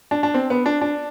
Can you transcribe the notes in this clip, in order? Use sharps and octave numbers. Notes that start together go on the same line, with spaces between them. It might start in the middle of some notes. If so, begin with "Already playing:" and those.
D4
D4
C4
B3
D4
D4